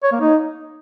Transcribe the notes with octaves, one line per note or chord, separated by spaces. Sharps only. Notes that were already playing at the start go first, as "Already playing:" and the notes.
C#5
A#3
D#4